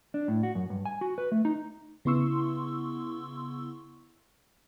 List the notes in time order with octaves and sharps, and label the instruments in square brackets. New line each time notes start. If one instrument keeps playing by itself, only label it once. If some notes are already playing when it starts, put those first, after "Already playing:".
[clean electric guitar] D4
A2
F#4
F#2
G2
G#5
F#4
B4
A3
D#4
[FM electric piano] C#3 B3 E4 C6 C#6 E6